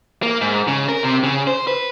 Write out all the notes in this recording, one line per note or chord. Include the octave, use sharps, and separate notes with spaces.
A#3
G#2
C#3
A#4
C3
C#3
C5
B4